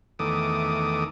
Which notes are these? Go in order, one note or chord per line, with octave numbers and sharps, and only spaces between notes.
E2 D#3 A3 D6 D#6